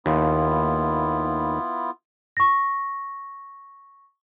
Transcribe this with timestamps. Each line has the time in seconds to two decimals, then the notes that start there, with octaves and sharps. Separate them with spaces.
0.06 D#2 B3 E4 F4
2.37 C#6 A#6